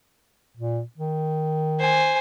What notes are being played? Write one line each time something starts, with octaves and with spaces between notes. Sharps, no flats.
A#2
D#3
C5 G#5